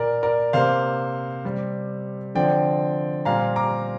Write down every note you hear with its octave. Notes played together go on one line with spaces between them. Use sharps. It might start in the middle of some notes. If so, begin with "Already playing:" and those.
Already playing: A#2 A#3 A#4 D5
A#4 D5
C3 A#3 C5 F5
C3 G3 C4
D3 F3 C4 D5 G5
A#2 G3 C4 F5 A#5
A#5 D6